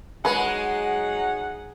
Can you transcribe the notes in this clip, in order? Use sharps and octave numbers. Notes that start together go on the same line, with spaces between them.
F#3 G#3 D#4 G#4 B4 F#5